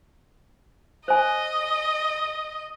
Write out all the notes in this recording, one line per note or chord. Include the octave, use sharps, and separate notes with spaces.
C5 D#5 G#5